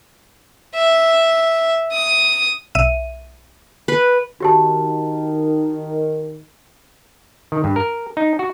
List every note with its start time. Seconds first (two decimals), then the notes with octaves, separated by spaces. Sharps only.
0.75 E5
1.92 D#6
2.75 B1 E5 D#7
3.88 B4
4.40 D#3 F#4 G4 A5
7.52 D#3
7.64 G2
7.76 A#4
8.17 D#4
8.39 F#4